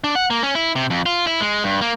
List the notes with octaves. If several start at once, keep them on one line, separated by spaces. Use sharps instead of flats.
D4
F#5
A#3
C#4
E4
C3
F2
F4
E4
G#3
G2
A#3